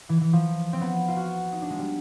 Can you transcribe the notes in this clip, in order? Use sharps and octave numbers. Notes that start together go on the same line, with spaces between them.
E3
E3
F3
C4
B3
F4
F#4
D#4
D4
G#3
G3